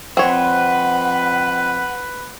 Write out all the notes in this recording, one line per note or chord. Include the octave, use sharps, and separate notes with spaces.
F2 C4 B4 C#5 F#5